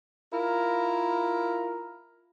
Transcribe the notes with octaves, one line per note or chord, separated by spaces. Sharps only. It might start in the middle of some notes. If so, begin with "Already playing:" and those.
E4 F4 A#4